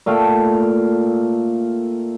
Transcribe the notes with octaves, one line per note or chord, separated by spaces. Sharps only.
A#2 A3 F5 G5